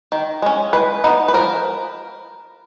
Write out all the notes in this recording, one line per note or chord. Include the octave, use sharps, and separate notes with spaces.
D#3
G#3 C#4
G#3 B4
B3 D#4
B4
F3 A#4